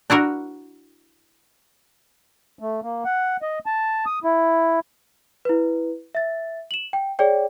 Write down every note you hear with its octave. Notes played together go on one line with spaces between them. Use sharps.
D4 E4 F#4 A#4
A3
A#3
F#5
D#5
A5
D#6
E4
E4 B4
E5 A6
E7 F#7
G5
G#4 C#5 D5 G5